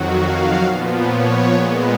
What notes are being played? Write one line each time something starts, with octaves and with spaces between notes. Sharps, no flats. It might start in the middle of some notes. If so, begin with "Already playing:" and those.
Already playing: F2 D#3 F#3 F#4
F5
A#2 F3 B3
C#5
A#2 G#3 B3